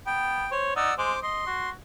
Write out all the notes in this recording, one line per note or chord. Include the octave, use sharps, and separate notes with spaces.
B3 G5
C5 C#5
D#4 D5 F#5 E6
G#3 C5 D6
D#5 C6
F#4